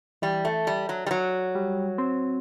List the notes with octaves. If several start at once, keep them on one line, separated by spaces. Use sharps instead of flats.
E3 G3
A3
G3
F#3
G3
F#3
G3
C4